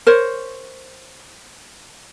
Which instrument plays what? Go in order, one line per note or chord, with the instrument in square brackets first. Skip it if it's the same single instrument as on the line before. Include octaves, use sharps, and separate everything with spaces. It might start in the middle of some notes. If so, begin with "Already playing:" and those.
[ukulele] A#4 C5 C#5